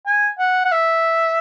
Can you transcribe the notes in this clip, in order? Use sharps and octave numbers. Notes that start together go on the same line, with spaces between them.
G#5
F#5
F#5
E5